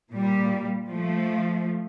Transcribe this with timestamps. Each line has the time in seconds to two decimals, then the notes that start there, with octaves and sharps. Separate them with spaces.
0.11 A#2 G3
0.88 F3 A3